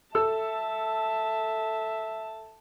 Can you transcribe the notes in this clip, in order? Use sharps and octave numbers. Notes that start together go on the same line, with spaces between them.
A4 E5 A5 E6